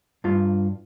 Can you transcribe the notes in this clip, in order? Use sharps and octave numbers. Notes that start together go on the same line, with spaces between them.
G2 F4